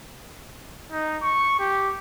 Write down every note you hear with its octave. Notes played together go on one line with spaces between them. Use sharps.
D#4
C#6
G4